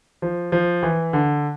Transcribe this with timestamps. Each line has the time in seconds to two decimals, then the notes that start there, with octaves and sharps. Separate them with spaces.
0.22 F3
0.52 F3
0.83 E3
1.13 D3